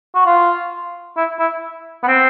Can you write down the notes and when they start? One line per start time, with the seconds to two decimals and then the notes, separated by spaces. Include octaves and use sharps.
0.15 F#4
0.26 F4
1.17 E4
1.39 E4
2.03 B3
2.08 C4